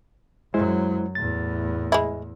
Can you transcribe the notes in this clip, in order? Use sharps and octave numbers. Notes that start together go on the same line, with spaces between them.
F#2 F#3 G#3 E4 C5
E2 A2 A6
G#3 E4